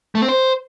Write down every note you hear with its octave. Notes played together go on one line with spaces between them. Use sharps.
A3
C4
C5